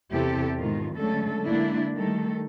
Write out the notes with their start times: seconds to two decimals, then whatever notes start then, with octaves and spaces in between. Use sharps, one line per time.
0.12 E2 C3 E4 G4 A4
0.56 G#2 B2 D#3 F4
0.95 D3 F#3 G#3 A3 C#4 A4
1.46 D3 G#3 A#3 D4 E4
1.95 D#3 G3 A3 A4